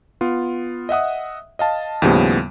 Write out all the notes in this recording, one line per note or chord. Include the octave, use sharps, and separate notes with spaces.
B3 F4
D#5 E5 F#5 D#6
D#5 F5 A5
D#2 A2 C#3 F3 G3 B3